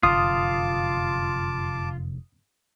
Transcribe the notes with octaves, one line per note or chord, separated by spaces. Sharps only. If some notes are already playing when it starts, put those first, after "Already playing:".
F1 F#2 D3 F4 A5 D6 D#6